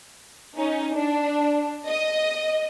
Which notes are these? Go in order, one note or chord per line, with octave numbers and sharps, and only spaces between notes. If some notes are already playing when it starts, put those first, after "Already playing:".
C#4 D#4
D4
D#5